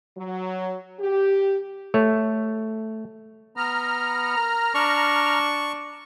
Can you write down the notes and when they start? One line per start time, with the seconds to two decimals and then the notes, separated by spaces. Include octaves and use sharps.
0.17 F#3
1.00 G4
1.94 A3 C#5
3.57 B3 A#5 F6
4.36 A#4
4.74 D4 C#6